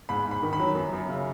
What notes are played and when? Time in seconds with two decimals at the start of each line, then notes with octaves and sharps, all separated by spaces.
0.09 G#2 B5
0.26 G#2
0.31 B5
0.43 D#3
0.53 B5
0.60 F#3
0.75 F#2
0.93 F#2
1.09 C#3